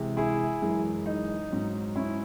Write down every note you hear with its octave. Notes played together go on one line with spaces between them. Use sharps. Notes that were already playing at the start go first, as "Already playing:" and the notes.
Already playing: C3 E3 G#3
E4 G#4
F#2 E3 G#3
D#4
G#2 F#3
C#4 E4